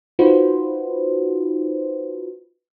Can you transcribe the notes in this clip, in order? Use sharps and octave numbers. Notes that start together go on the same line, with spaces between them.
D#4 F4 F#4 B4 C5